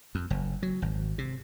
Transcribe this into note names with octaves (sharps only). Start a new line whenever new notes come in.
F2
F#1
F#3
G#1
C3